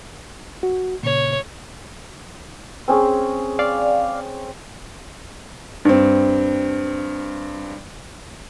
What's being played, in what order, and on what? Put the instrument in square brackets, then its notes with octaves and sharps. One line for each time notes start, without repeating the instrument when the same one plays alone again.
[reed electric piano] F#4
[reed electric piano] A#2 C#3 [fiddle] C#5
[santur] C4 C#4 G#4
[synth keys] D5 F5
[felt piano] G2 C4